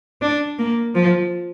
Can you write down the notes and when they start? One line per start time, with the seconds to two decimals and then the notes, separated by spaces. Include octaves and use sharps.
0.21 D4
0.59 A#3
0.95 F3